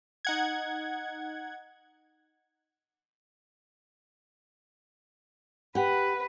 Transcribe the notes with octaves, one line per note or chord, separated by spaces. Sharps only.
D#4 F#5 G#6
G4 B4 F#5